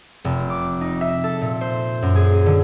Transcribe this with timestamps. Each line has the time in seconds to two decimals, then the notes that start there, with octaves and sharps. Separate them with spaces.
0.25 F1
0.50 D6
0.81 D#4
1.01 E5
1.24 A4
1.41 A#2
1.61 C5
2.02 F#2
2.16 G#4
2.46 D3